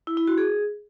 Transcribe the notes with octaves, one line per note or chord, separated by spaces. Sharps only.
E4
E4
F#4
G#4